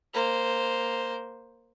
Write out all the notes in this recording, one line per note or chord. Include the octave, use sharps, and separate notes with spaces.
A#3 C5